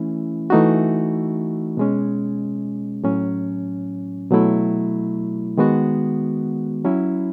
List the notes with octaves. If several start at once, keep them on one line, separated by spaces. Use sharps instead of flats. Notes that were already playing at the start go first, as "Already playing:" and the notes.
Already playing: E3 A3 C#4 E4
E3 A3 D#4 F#4
B2 G#3 C#4
A2 F#3 C#4
B2 F#3 A3 E4
D#3 G#3 B3 F#4
F#3 C#4 E4